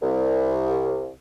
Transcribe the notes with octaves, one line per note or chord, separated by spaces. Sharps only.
C2